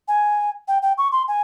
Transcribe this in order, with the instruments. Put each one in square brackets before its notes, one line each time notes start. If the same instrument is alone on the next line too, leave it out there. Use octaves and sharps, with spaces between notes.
[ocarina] G#5
G5
G5
C#6
C6
G#5